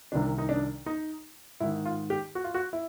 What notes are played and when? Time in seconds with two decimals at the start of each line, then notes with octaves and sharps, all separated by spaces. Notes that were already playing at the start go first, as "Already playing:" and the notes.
0.12 C2 C3 D#3 D4
0.38 D#4
0.49 D4
0.86 D#4
1.60 G#2 D#3 E4
1.86 F4
2.10 G4
2.35 F#4
2.44 F4
2.54 F#4
2.73 E4